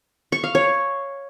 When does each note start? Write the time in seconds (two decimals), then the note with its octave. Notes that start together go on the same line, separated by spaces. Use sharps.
0.32 C#6
0.44 F5
0.55 C#5